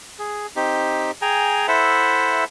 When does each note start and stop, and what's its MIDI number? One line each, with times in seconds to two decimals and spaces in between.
0.19 0.47 68
0.56 1.11 60
0.56 1.11 63
0.56 1.11 67
1.22 1.67 68
1.22 1.67 79
1.22 1.67 80
1.22 1.67 82
1.68 2.44 64
1.68 2.44 69
1.68 2.44 72
1.68 2.44 76
1.68 2.44 78